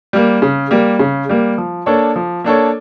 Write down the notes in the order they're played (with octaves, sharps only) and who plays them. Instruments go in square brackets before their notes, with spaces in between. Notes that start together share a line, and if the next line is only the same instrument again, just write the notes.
[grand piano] G3 A#3
C#3
G3 A#3
C#3
G3 A#3
F3
A#3 D4 A4 C#5
F3
A#3 D4 A4 C#5